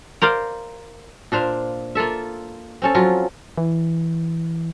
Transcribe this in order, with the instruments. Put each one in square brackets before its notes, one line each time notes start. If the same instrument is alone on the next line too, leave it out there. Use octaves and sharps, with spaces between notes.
[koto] A#4 C5 D5 F5
[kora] A#2 D4 C5 F5
A#3 F4 A4 E5
C4 C#4 A4
F3 F#3 F4
[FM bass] E3